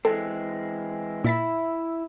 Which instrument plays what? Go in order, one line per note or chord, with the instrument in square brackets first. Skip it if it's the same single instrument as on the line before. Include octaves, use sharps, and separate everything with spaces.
[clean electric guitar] E3 G#3 C4 [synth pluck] A4
[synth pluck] A#2 A6 B6 [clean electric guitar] E4 E5 B5